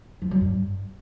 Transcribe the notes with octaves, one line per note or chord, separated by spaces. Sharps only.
F3
F#3
G2